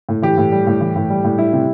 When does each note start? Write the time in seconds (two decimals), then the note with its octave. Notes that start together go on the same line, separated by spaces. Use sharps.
0.09 A2
0.22 E3 G4
0.38 A2
0.52 G3
0.67 A2
0.81 E3
0.96 A2
1.10 G3
1.24 A2
1.38 G3 E4
1.53 C3